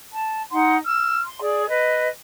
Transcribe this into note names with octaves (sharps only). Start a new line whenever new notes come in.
A5
D#4 F#5 C6
E6 F6
C6
G#4 D5
B4 D#5